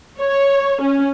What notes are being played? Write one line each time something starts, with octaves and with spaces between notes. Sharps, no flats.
C#5
C#4